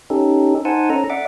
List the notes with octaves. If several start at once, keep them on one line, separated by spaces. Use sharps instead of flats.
C#4 D#4 G4 A4
D#4 C5 F#5 G#5 A5
C#4 A4 A#5
D5 E5 F#5 D6